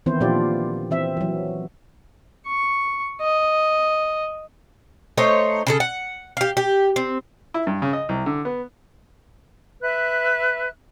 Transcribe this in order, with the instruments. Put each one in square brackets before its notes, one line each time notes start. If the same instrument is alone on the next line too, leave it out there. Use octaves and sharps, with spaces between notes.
[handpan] D#3 E3 B3 C4 E4 C5
A#2 F3 D4 F4 G4 D5
E3 C4 E5
E3 F#3
[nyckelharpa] C#6
D#5
[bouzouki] A3 D#4 C5 C#5
C#3 G#4 A4
F#5
G4 F5
G4
C4
[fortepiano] E4
G2
C#3
D#5
C2
D3
B3
[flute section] B4 E5 F#6